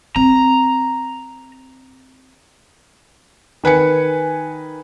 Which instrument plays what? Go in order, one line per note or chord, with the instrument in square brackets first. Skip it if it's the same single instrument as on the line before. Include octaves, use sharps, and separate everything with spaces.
[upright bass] C4 [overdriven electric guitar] A#5
[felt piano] D#3 B4 G#5 C#7